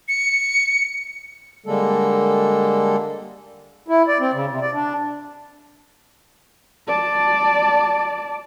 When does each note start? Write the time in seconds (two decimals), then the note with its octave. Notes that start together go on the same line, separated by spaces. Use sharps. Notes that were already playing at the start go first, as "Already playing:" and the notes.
0.08 C#7
1.66 D3 G3 G#3 A#3 A4
3.88 E4
4.08 D5
4.20 C4
4.33 C#3
4.50 C3
4.62 D5
4.73 D4
6.88 D5 A5